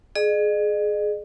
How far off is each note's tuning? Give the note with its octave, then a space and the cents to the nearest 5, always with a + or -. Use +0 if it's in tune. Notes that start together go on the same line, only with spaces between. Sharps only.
G#4 +20 D#5 -45